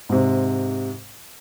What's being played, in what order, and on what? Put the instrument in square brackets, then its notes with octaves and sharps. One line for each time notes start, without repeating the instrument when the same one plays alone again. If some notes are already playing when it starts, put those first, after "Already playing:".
[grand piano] G#2 C3